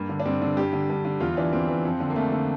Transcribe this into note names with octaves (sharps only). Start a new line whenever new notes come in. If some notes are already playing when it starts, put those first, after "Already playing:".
Already playing: G2 A#3
D3
D4
G2 C4
D3
G2 G4
D3
G2
D3
E2 F4
E3 D4
E2 C4
E3
F2
D3
A#3
F2 A3
D3